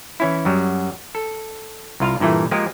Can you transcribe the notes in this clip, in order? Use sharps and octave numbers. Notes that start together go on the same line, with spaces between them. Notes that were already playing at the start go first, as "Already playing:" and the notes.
E3 C#4 E4
F#2 F#3 G3
A4
C2 F4 F5
G2 A#2 E3 A3
F3 G#3 A#3 F4 G4